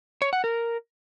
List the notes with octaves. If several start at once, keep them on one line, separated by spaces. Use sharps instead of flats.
C#5
F#5
A#4